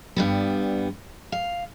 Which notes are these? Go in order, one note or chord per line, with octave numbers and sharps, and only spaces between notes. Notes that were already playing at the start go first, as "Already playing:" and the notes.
G2 G3 B3
F5